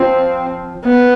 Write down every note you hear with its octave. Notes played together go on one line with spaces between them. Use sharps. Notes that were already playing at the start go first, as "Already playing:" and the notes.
Already playing: F3 C4
B3